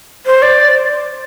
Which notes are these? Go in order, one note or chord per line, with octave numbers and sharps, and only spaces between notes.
C5
D5